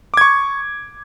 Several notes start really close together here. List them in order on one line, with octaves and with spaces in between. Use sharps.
D6 G#6 C#6